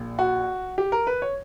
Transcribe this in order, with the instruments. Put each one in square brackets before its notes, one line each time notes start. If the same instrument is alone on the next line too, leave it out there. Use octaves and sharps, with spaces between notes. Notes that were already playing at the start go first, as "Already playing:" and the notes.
Already playing: [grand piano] A#1 A#2
F#4
G4
A#4
B4
C#5